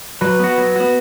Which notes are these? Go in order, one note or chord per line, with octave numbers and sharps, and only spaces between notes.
F#3 B4
B3 F#4
F#3
B3 F#4